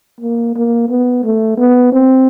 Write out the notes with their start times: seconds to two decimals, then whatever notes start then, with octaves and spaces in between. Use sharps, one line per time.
0.21 A#3
0.56 A#3
0.89 B3
1.24 A3
1.58 B3
1.93 C4